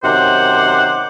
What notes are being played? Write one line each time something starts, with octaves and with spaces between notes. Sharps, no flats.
F#2 C3 D#3 C5 F#5 D6